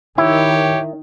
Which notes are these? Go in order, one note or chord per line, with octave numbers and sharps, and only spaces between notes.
D#3 E4 G4 C#5